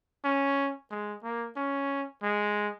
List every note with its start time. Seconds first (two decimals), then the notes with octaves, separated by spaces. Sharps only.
0.24 C#4
0.91 G#3
1.23 A#3
1.56 C#4
2.22 G#3